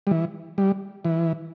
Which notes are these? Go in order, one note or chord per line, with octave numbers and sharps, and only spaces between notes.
G3
E3
G3
E3